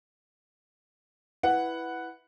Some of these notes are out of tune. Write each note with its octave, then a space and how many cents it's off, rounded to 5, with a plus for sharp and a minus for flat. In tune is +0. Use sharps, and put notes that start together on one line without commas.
E4 +0 B4 +0 F#5 +0